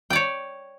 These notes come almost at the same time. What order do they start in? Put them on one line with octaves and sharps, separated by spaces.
G5 D5 C#5